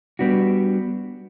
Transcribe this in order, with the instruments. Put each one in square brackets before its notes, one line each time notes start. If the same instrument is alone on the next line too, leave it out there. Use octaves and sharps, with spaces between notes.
[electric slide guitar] G3 B3 D4 F#4